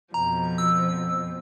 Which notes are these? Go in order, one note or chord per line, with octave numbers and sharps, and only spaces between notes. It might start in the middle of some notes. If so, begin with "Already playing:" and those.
F2 B2 F3 A#5
E6